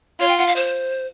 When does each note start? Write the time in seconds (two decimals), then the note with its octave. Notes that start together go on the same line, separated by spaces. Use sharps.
0.20 F4 C#5
0.28 G5
0.38 F#5
0.47 F5
0.56 C5